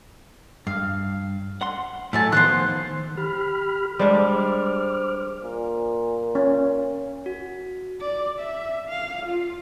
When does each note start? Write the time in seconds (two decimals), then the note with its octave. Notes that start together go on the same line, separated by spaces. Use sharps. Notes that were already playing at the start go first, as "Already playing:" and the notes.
0.67 G2 F5
1.61 F#5 C6
2.13 A2 F#3 A3 G#5 A5
2.32 D#3 F3 B3 C5 C6 F#6
2.90 D#3
3.17 G4 B5 F6
3.99 G3 G#3 D4 C5 D6 F6
5.44 A#2
6.35 C#4
7.26 F#4
8.01 D5
8.40 E5
8.89 F5
9.26 F4